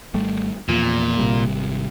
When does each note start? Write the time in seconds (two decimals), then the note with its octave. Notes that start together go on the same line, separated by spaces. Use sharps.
0.14 G#1 G3 A3
0.69 E2 A#2 F3
1.18 G#1 C3 G3